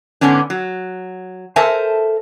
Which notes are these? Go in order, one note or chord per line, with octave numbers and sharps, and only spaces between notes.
G#2 D3 B3 C#4 D4
F#3
A4 A#4 C5 E5 G#5 A5